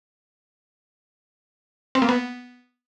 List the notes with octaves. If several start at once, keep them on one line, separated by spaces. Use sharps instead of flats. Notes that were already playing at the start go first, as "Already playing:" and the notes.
C4
A#3
B3